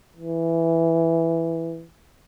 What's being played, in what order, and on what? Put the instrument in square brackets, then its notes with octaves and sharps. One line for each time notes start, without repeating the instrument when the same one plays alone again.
[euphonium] E3